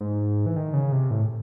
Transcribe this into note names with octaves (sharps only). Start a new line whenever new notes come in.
G#2
E3
D#3
C#3
C3
A2